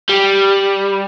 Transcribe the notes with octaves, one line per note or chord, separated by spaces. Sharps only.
G3